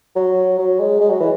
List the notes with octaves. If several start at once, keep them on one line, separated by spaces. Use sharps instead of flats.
F#3
F#3
G#3
G#3
F#3
E3